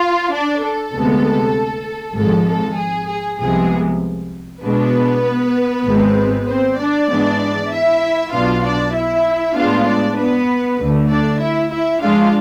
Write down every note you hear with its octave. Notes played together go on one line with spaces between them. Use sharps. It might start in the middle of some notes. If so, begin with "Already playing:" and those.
Already playing: F4 F5
D4 D5
A4
D2 C3 G#3 B3
G#1 G#2 F3 G#3 A4
A4
G#4
G#4
C2 C3 F3 G#3 B3 G#4
B2 G#3 B3 D4 B4
G#1 G#2 G#3 C4
C4 C5
D4 D5
G#2 E3 G#3 B3 D4
E4 E5
B1 B2 B3 D4 F4 F5
D4 D5
E4 E5
A2 G#3 B3 D4 F4 F5
D4 D5
B3 B4
D2 D3 A3
D4 D5
E4 E5
E4 E5
G#2 F3 G#3 D4 F4 F5